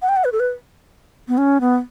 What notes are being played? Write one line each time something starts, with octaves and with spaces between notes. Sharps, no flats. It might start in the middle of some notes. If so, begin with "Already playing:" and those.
F#5
G5
F#5
B4
A4
B4
B3
C#4
B3